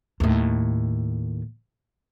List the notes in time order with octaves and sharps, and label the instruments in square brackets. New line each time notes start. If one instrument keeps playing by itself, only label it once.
[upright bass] D#2 A2